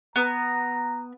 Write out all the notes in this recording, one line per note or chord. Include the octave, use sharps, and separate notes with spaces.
B3 A#5